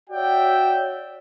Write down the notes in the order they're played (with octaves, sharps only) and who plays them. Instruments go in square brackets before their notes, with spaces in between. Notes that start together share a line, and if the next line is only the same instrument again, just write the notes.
[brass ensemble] F#4 C#5 D5 E5 F#5 G5